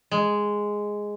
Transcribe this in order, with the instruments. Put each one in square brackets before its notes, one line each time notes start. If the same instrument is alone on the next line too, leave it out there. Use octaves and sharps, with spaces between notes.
[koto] G#3